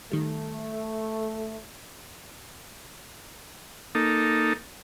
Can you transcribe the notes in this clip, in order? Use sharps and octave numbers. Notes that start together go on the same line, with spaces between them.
D#3 G3 A3
A#3 D#4 A4